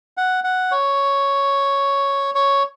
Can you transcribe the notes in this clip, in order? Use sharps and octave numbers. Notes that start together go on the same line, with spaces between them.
F#5
F#5
C#5
C#5